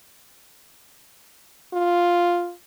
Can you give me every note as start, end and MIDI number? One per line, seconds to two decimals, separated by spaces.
1.73 2.52 65